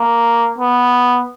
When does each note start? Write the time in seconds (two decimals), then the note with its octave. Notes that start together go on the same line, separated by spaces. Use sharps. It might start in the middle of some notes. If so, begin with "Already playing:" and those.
Already playing: A#3
0.58 B3